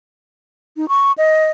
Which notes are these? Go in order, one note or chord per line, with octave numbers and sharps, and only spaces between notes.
D#4
C#6
D#5